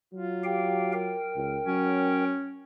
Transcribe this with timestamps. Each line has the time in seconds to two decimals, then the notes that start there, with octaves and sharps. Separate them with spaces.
0.14 F#3 F4
0.44 G4 F5 G5
0.93 A#4 G5
1.35 C#2
1.66 F#3 C#4